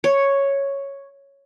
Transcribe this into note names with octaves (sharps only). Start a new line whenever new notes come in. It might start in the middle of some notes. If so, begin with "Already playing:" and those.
C#5